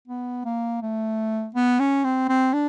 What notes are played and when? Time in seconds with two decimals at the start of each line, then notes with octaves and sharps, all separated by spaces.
0.08 B3
0.45 A#3
0.82 A3
1.55 B3
1.79 C#4
2.04 C4
2.29 C4
2.53 D4